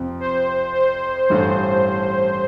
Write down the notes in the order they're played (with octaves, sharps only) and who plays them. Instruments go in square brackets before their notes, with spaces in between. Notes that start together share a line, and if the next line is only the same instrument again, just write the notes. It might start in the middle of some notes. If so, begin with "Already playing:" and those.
Already playing: [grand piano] F2 C3 F3 C4
[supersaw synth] C5
C5
[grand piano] A1 G2 E3 A3 [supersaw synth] C5